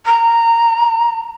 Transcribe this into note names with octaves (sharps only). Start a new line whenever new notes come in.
A#5